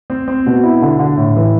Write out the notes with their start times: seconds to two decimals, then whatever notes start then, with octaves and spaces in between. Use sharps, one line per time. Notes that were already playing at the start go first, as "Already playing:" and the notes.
0.10 C4
0.28 C4
0.46 B2
0.64 E4
0.82 D3
0.99 D3
1.17 A2
1.36 E3